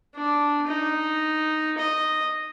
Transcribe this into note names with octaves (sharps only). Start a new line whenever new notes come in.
D4
D#4
D#5